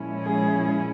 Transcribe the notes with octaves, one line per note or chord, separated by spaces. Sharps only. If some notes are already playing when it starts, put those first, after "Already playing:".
Already playing: A#2 F3 G#3 C#4 E4
G#4